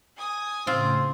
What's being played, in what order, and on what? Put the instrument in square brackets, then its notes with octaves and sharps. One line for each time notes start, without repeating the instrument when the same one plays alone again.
[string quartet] G#5 D#6
[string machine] A2 C#3 [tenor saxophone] C4 [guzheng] F4